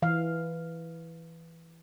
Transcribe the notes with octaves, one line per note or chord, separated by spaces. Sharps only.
E3 F5